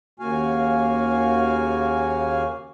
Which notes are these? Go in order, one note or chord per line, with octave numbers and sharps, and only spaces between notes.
D#2 C#3 A#3 F#4 F5 G#5